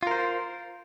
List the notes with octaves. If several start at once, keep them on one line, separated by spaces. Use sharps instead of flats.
F4 A#4 C5